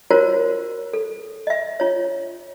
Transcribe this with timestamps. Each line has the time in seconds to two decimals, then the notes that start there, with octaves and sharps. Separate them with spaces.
0.11 F4 F#4 A#4 C5 C#5
0.93 A4
1.47 D#5 E5
1.80 F4 C#5